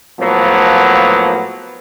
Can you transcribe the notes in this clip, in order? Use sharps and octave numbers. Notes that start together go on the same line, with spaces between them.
A2 F3 F#3 A#3 B3